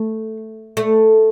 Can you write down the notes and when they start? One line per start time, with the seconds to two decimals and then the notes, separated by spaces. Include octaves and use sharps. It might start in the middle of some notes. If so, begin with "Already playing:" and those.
Already playing: A3
0.77 A3